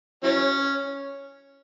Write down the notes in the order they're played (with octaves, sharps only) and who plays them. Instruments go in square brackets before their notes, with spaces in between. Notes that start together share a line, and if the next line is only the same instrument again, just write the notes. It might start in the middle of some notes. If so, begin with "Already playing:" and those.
[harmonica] E3 F#3 C#4